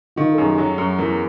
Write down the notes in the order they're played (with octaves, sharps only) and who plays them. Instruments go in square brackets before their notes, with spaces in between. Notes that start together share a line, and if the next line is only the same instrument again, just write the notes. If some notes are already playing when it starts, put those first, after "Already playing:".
[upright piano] D#3 [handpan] F4
[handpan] A4
[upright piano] F#2 [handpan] G#4
[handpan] G4
[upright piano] F#3 [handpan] F#4
[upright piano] F#2
[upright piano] E2 [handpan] A#4